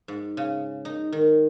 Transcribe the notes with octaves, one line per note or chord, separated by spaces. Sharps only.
G#2
C#3
D#4
D#3